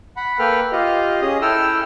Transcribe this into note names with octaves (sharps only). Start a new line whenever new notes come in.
F#5 B5
A#3 A4 B4 G5 F6
F4 G4 D#5 F5
C#4 G#4 D#5 D#6
E4 A4 G5 E6 F6